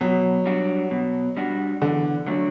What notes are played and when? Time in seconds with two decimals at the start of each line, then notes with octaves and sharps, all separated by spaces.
0.01 B2 F#3
0.46 G3 D4 F#4
0.91 B2
1.37 G3 D4 F#4
1.82 E2 D3
2.27 D3 F#3 A3 D4 F#4